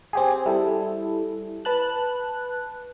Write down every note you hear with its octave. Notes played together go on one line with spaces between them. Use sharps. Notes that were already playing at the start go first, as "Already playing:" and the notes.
C4 G4 G#4
G3 E4 A4
B4 A5 F#6